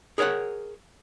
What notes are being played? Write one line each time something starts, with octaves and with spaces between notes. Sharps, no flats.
G#4 A#4 C#5 F5 F#5